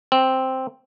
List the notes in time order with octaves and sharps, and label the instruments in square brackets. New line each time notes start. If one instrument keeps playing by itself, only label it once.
[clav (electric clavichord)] C4